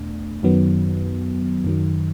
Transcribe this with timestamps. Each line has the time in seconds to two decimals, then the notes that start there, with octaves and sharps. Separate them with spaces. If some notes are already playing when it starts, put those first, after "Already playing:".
Already playing: E2 B2 A3 D4
0.43 F#2 D#3 F#3 B3
1.64 F#2 D#3 F#3